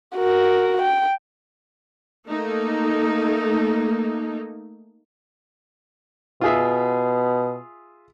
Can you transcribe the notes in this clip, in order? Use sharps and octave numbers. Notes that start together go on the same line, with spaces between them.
F#4 A#4
G5
A3 A#3 D#4 A4
B2 F4 G#4 E5